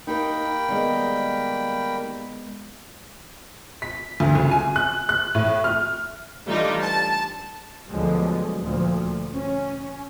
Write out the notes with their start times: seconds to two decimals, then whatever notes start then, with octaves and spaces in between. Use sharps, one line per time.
0.07 A#3 D#4 G4 A#4 G5 B5
0.69 D#3 G3 G#3 B3
3.82 B6
4.20 D2
4.35 C#2
4.51 G#5
4.76 F#6
5.09 F#6
5.35 A2
5.64 F6
6.46 E3 G3 A3 D4 D#4 F4
6.82 A5
7.89 D2 B2 D3 F3 F#3 G#3
8.61 D2 A#2 F3
9.34 C#4